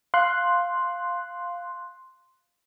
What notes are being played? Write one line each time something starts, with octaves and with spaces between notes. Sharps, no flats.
F5 C6 F#6